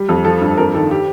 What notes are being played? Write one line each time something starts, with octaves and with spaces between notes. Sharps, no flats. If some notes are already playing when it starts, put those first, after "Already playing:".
Already playing: G3
F2
F3 A4
G2
F2 A#4
D#3 A4
G4